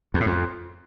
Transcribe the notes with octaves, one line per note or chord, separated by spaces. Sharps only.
E2
A2
F2